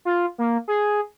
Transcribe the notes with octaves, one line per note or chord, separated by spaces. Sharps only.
F4
A#3
G#4